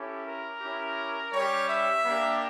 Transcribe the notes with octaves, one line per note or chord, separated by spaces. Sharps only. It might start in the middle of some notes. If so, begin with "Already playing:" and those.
Already playing: C#4 E4 G4 A4
A#4
C#4 E4 G4
G3 C#4 G4 C#5
E5
A#3 D4 G4